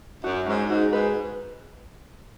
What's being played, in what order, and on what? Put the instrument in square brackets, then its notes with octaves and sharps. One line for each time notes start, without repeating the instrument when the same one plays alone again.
[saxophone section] F#2 [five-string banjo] F#4
[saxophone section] G#2 [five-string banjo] C#4
[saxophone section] G#2 [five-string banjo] F#4
[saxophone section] G#2 [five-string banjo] B4